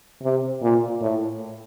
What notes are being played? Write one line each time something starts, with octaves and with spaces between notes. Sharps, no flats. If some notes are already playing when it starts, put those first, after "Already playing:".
C3
A#2
A2